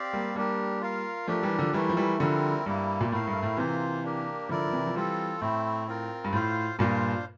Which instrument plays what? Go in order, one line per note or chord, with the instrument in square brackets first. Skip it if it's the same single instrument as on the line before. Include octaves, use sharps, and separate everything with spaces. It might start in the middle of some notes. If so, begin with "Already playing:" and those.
Already playing: [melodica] C4 G4 D5 F5
[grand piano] G3 A#3
[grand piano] G3 A#3 [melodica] D4 G4 A#4
[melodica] F4 A#4 F5
[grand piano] F3 A3 [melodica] D4 G4 A#4
[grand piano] E3 G3
D3 F3
[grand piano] E3 G3 [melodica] A3 E4 A#4
[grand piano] F3
E3 G3
[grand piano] D3 F3 [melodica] G3 C4 E4 A#4
[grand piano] G2 [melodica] G3 A#3 E4
[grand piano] A#2
[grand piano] A2 [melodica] A3 E4 A#4 F5
[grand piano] G2
A2
[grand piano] C3 E3 [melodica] A#3 F4 C5
[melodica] A#3 D4 G4 A#4
[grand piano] D3 F3 [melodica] E4 A#4 D5
[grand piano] F3
C3 E3
F3
[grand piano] E3 G3 [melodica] C4 F4 A4
[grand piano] A2 [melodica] A3 C4 E4
[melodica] C4 F4 A#4
[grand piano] G2
[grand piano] A2 [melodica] F4 C5 F5
[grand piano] G2 A#2 [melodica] D4 F4 C5 F5